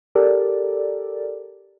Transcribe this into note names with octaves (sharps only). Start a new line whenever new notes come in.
G4 A4 A#4 D5